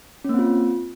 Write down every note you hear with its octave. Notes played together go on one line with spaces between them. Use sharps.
A#3 C4 C#4 F4